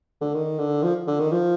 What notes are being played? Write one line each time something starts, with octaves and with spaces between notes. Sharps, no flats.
D3
D#3
D3
F3
D3
D#3
F3